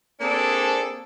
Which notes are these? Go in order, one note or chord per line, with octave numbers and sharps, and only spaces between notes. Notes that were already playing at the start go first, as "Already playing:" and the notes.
A#3 C4 D4 G#4 A4